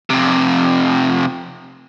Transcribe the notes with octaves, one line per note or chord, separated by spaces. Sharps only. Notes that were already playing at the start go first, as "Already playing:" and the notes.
F2 C3